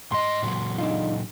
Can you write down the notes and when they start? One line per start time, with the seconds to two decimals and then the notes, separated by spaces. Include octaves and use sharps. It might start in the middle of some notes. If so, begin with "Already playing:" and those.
0.12 G#2 D#5 C6
0.43 A#2 C#3 F#3
0.78 D4 D#4 F4